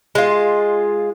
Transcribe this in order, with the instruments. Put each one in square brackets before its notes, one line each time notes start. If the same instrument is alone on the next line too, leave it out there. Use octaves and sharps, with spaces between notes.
[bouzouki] G#3 F4